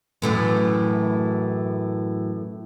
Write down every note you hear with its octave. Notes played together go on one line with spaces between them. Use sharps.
F#2 A2 E3